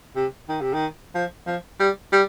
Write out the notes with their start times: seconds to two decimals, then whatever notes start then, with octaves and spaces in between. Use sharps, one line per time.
0.16 C3
0.49 D#3
0.61 C3
0.74 D#3
1.15 F3
1.47 F3
1.80 G3
2.12 G3